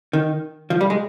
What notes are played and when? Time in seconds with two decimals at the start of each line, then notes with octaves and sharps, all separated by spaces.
0.13 D#3
0.70 F3
0.81 G3
0.90 G#3